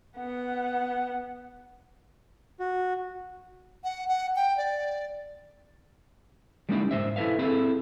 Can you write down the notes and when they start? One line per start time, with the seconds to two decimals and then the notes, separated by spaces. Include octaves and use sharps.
0.17 B3 F#5
2.60 F#4
3.84 F#5
4.08 F#5
4.36 G5
4.57 D5
6.69 G3 G#3 A#3 C#4 D#4 E4
6.91 G#2 E3 C5 E5
7.16 E4 A4 B4 E5 F5
7.39 C4 E4 G#4 A4